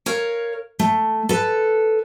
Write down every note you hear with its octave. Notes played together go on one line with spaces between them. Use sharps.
A#4 C#5 F5
A3
A4 B4